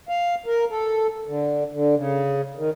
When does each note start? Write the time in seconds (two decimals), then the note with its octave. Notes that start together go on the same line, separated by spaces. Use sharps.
0.09 F5
0.46 A#4
0.71 A4
1.27 D3
1.72 D3
1.96 C#3
2.57 D#3